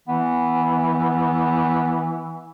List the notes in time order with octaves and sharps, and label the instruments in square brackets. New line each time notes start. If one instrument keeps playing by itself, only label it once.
[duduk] E3 [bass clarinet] B3